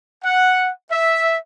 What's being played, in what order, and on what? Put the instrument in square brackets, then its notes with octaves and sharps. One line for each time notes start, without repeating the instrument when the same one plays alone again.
[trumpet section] F#5
E5